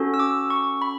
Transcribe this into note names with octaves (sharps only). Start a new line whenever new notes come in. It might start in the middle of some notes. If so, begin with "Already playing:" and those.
Already playing: C#4 F#4 A4
E6
D6
C#6
B5